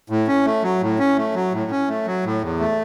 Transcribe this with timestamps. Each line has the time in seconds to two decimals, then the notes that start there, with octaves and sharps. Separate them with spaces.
0.10 A2
0.27 C#4
0.45 A3
0.63 F#3
0.81 A2
0.99 C#4
1.17 A3
1.35 F#3
1.53 A2
1.71 C#4
1.88 A3
2.06 F#3
2.24 A2
2.42 E2
2.60 A3